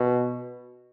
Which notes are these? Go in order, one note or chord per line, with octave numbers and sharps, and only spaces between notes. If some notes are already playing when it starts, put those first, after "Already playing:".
Already playing: B2